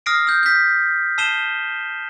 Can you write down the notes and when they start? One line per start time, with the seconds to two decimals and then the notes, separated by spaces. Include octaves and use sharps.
0.06 D#6 F6 A#6 C7 D7
0.27 E6 G6
0.43 G6 B6
1.18 A5 E6 C7 D#7 E7 G7